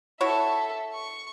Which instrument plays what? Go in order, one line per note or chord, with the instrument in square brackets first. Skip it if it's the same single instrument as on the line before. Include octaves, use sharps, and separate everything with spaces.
[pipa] E4 F#4 C#5 [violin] A4 E5
[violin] C#6